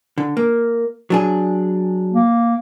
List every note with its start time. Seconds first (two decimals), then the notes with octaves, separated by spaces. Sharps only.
0.18 D3
0.37 A#3
1.10 F#3 D4 G#4
2.13 A#3